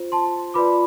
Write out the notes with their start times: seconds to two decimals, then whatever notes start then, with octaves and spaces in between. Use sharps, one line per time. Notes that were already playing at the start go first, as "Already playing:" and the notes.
Already playing: F4 C5
0.12 A5 C6
0.54 F4 B4 D5 B5 D6